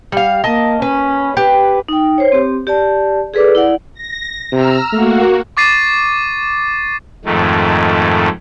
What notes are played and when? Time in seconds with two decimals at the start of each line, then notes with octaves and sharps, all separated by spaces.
0.12 G3 F5
0.44 A#3 D#5 A5
0.82 C#4 B4
1.37 G4 B4
1.88 D#4 G5
2.18 C5 C#5
2.32 C4 G4
2.67 G4 D5 A5
3.34 G#4 A4 B4 D5 D6
3.55 E4 D5 F#5
3.94 A#6
4.52 C3 A#5 E6 F6
4.92 A3 A#3 F#4
5.57 C#6 D6 A6 C7 D#7
7.25 F2 G#2 D#3 A3